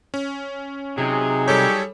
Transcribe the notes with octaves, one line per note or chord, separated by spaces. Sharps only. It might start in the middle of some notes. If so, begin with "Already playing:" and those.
C#4
C3 F#3 D#4 G#4
G3 G4 A4 C#5